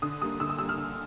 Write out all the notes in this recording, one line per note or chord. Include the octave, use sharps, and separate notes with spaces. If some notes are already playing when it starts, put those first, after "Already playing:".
D3 D#6
G3 A#3 D#6
D3 E6
D#6
G3 A#3 E6
F6
D3